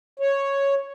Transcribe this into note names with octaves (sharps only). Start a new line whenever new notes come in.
C#5